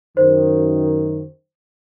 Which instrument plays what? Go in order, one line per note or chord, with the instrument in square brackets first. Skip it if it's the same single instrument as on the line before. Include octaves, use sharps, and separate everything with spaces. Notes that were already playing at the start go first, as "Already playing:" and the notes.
[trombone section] F#2 D#3 [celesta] C5